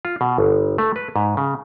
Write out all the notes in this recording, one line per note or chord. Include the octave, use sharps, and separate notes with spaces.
F4
B2
G1
A3
B4
G#2
C#3